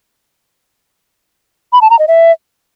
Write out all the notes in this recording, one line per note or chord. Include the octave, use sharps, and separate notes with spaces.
B5
A5
A#5
D#5
E5